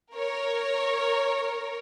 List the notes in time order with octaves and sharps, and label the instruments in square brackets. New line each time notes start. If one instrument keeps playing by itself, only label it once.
[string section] A#4 C#5